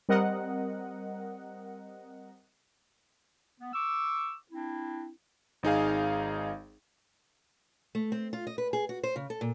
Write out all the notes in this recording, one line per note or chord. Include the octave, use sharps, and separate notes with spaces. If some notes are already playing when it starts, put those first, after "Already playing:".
G3 C4 A#4 D#5 F#5
B3
C#6 D6 E6
C4 D4 E4
G#1 D#4 G#4 F5
A3
C4
F4
D#5
B4
G#4
F#4
C5
C#3
A4
A#2